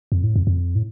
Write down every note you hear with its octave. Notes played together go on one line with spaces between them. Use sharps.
F2
A2
F2
F2
A2